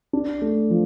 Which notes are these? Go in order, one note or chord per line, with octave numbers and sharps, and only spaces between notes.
D4
A3
F3